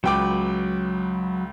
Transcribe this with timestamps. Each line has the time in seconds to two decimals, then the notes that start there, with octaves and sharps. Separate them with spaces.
0.04 C#2 F#3 B4 G5 D6